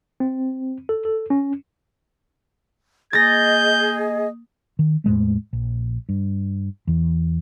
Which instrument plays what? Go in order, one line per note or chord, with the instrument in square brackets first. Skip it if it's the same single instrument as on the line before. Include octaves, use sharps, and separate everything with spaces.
[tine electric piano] C4
A4
A4
C#4
[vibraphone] A#3 D#6 [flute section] G#4 D#5 [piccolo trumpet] G6 [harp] A6 A#6
[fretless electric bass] D#3
E2 A2 G#3 A3
A#1
G2
E2 E3